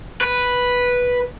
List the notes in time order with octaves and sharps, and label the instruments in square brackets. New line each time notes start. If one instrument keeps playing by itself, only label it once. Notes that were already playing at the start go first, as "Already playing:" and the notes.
[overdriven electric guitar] B4